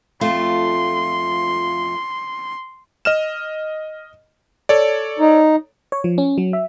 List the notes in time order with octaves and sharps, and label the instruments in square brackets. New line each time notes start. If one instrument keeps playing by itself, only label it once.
[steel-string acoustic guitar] F2 A3 F4 [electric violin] C6
[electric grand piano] D#5 F6 E7
A4 C#5 D5
[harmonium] D#4
[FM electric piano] C#5
F3
C#4
F#3
E5